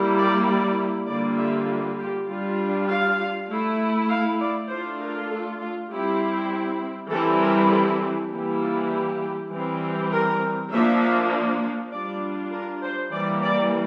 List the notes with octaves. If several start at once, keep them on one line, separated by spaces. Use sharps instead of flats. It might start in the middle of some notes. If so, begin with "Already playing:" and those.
Already playing: G3 A#3 E4
D5
D5
D3 G3 A#3 F4 D5
E5
G4
G3 D4 F4
F5
A3 E4
F5
D5
A3 D4 F4 C5
A#4
A4
F4
G3 C4 E4 G4
E3 G3 C4 E4 A4
A#4
A4
E3 G3 A#3 E4 G4
F4
G4
E3 G3 C4
A#4
F3 A#3 D4 E5
G3 D4 F4 D5
A#4
C5
E3 G3 A#3 D5
D5